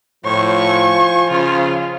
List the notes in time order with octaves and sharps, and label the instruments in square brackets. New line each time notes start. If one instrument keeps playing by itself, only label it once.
[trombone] A2 [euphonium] F3 [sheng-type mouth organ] C5 C#5 [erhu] C#6
[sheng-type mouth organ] C5 G#5
[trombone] C#3 [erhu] F4